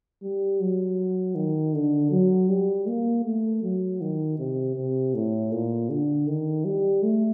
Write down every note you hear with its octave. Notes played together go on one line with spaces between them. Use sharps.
G3
F#3
D#3
D3
F#3
G3
A#3
A3
F#3
D#3
C3
C3
A2
A#2
D3
D#3
G3
A3